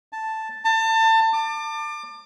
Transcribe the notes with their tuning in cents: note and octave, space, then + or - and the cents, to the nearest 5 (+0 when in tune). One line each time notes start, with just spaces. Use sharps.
A5 +0
A5 +30
D6 +30